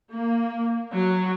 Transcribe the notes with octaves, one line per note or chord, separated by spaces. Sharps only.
A#3
F#3